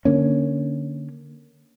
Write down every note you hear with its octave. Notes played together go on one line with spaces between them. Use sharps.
D3 A#3 C#4